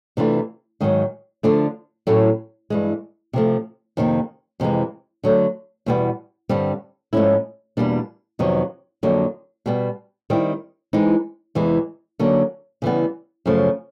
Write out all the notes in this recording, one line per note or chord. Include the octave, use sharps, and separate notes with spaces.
C3 E3 A3 D4 F4
G#2 D#3 F#3
D3 F3 A3 D4 F4
A2 F#3 A3 C#4
G2 E3 G#3
C3 F3 A3
F2 C3 D#3 G3 A#3
F2 C3 E3 G#3
D3 F#3 A3
E2 B2 G3 B3
G2 D3 G3 C4
G#2 F3 A3 C#4 E4
E2 B2 G3 A#3 D4
F2 C3 D#3 F#3 B3
F2 D3 F#3 A#3
B2 G3 B3
D#3 G3 C4 E4
E3 G#3 C4 D#4
E2 C3 E3 G#3
D3 F#3 A#3 C#4
C#3 E3 G3 B3
F#2 C#3 F3 A3